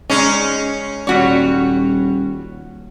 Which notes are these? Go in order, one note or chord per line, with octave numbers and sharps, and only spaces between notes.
G#3 C#4 D#4
D#1 G3 F#4 C#5